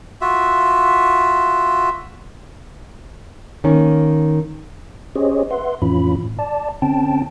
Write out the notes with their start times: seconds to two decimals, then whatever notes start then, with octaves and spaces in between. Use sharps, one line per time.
0.21 F4 F#4 E5
3.64 D#3 A#3 C#4
5.15 C#4 G4 G#4 C5 C#5 D#5
5.51 B4 E5 F#5 C6
5.82 F2 A2 E3 C#4 F4 B5
6.23 A2
6.39 D5 A5
6.82 D3 C4 C#4 G5 A5